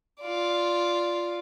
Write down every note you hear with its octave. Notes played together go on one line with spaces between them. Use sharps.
F4 D5